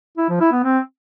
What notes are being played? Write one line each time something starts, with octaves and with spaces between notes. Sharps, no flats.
E4
F3
E4
B3
C4